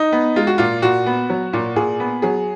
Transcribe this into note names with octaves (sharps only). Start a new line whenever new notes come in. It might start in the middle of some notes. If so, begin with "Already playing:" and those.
Already playing: D#4
B3
G#3 F4
F#4
A#2 F4
A#2 F#4
B3
F#3
A#2
A#2 G#4
B3
F#3 G#4